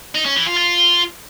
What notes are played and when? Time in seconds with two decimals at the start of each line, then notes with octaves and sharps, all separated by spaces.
0.15 D#4
0.26 C#4
0.36 E3
0.47 F4
0.57 F4